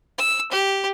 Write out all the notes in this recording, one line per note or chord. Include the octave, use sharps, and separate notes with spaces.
E6
G4